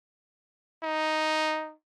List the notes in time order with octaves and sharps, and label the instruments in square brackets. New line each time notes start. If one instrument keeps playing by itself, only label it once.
[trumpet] D#4